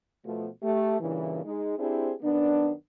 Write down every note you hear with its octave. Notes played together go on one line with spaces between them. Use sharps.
B2 F3 A3
A3 G4
G2 A#2 C#3 E3
G#3 D#4 G#4
C4 D4 E4 G4 G#4 C5
F#2 D#3 B3 D4